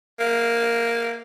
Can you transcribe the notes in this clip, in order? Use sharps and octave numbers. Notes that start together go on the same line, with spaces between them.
A#3